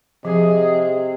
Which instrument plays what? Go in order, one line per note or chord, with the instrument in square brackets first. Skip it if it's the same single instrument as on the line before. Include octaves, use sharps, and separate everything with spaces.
[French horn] C3 [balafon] F3 [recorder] G#4 [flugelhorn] D#5